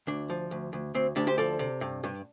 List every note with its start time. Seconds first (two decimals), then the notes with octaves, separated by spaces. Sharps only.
0.07 D2 D4
0.30 F3
0.51 D2
0.73 D2
0.94 D2 C4
1.16 D2 D4 G4
1.27 G4 C5
1.38 F3 A4 D5
1.59 C3
1.81 G2
2.04 G2